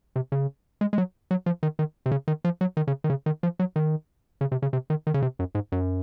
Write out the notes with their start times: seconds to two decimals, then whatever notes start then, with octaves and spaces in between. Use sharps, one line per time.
0.16 C3
0.32 C#3
0.81 G#3
0.93 G#3
0.98 F#3
1.31 F#3
1.46 F3
1.63 D#3
1.79 D#3
2.06 C3
2.11 C#3
2.28 D#3
2.45 F3
2.61 F#3
2.77 D#3
2.87 C#3
3.04 D#3
3.10 C#3
3.26 D#3
3.43 F3
3.59 F#3
3.76 D#3
4.41 C#3
4.52 C3
4.62 C#3
4.73 C3
4.90 D#3
5.07 D#3
5.14 C#3
5.22 C3
5.39 F#2
5.55 G#2
5.72 F#2